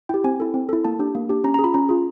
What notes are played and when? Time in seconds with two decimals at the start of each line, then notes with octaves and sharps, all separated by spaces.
0.09 E4 G4 G5
0.24 C4 G#5
0.40 E4 A4
0.54 C4
0.69 E4 A4
0.84 A#3 A5
0.99 D4 G4
1.15 A#3
1.29 D4 G4
1.44 C#4 A#5
1.54 A#5
1.59 G#4
1.64 F4 B5
1.74 C#4 A#5
1.89 F4 G#4